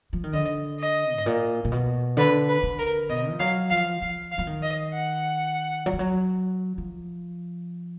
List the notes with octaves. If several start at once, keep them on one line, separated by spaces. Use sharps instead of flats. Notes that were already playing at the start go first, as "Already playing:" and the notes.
F3
D#3
D3 D#5
D#5
G#2
A#2
A#2
B2
D3 B4
B4
D3
A#4
B2 D#5
F3
F#3 F5
F3 F5
F3 F5
F5
F3
D#3
D#5
F#5
F#3
F3
F#3
F3